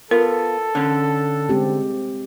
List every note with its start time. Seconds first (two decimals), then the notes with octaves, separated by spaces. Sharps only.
0.11 B3 F4 A4 A#4
0.75 D3 C#4
1.49 G#3 C4 G4